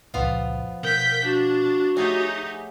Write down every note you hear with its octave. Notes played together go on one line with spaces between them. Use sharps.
C#2 F#2 A#2 F3 B3 F4
B2 A#4 G5 F#6 G#6 B6
D4 F#4
A3 D#4 G4 G#4 C#5 F#5 G#5